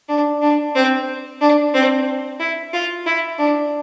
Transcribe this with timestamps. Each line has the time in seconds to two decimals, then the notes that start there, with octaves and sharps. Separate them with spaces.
0.09 D4
0.42 D4
0.75 C4
1.41 D4
1.74 C4
2.40 E4
2.73 F4
3.06 E4
3.39 D4